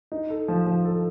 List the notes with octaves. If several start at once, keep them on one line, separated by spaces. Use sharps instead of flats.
D#4
A4
F3
F3
A4